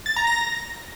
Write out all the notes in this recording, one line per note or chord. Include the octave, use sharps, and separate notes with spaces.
A6
A#5
A#6